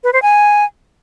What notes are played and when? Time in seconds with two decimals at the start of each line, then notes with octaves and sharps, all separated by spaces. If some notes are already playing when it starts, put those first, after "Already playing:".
0.04 B4
0.13 C5
0.22 G#5